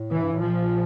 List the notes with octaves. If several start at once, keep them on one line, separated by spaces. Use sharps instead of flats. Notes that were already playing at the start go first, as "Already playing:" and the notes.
Already playing: A2
E3
G2
A2
A#2 F3